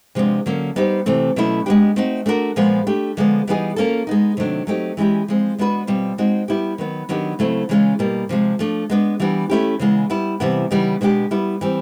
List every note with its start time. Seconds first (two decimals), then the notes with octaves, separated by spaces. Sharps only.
0.15 C3 F3 G#3 B3 D4
0.46 D3 F#3 A#3 C#4
0.76 G3 B3 D#4 G4 C5
1.06 C3 E3 A3 C4
1.36 B2 F#3 A3 C#4 E4
1.66 G#3 B3 D4 G4
1.96 A3 C4 D#4 F#4
2.26 A3 D4 F#4 A#4
2.56 A#2 F3 G#3 B3
2.87 A3 D4 G4
3.17 D3 F3 G#3 B3
3.47 E3 G3 B3 D#4 G#4
3.76 A#3 C#4 F4 A4
4.07 G#3 B3 D#4
4.37 C3 D#3 F#3 A3 D4
4.67 F#3 A3 C4 D#4 G4
4.97 E3 G#3 C#4 E4 G4
5.28 F3 G#3 C4
5.58 G#3 B3 D4 F#4 B4
5.87 B2 G3 C4 F4
6.18 G#3 C4 D#4 F#4
6.48 G3 B3 E4 G4
6.78 D#3 F#3 B3
7.09 D#3 F#3 B3 D4 G4
7.39 C#3 F#3 A3 C4 E4
7.69 C#3 E3 G#3 C#4 F4
7.99 B2 G3 A#3
8.29 C3 F3 G#3
8.59 F3 A3 D4
8.90 G#3 B3 D4
9.20 E3 G3 B3 D4
9.50 A3 C#4 E4 G4
9.79 C#3 E3 G#3 B3
10.10 G3 B3 E4
10.40 C3 E3 G3 B3 E4
10.71 C#3 E3 G3 B3 D#4
11.01 B2 G#3 B3 D4 G4
11.31 G3 B3 E4
11.61 E3 G3 C4